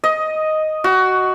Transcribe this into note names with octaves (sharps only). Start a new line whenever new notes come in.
D#5
F#4